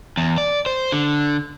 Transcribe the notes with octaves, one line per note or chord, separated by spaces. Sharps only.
E2
D5
C5
D3